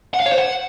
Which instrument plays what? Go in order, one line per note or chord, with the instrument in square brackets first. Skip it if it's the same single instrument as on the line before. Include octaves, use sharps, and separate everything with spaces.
[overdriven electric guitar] F#5
F5
C#5
C5
F#5